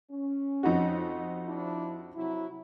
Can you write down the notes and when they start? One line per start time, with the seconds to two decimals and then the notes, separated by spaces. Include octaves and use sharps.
0.11 C#4
0.63 F2 D#4 F#4
1.46 F3 D4 E4
2.16 C3 F#3 E4